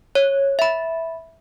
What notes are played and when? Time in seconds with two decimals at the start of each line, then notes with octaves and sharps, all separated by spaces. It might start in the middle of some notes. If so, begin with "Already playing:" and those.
0.15 C#5
0.59 E5 B5